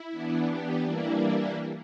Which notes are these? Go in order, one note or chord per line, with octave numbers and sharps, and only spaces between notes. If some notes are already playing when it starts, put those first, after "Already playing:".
Already playing: E4
E3 B3 D4
G4
E3 G3 A#3 D4 E4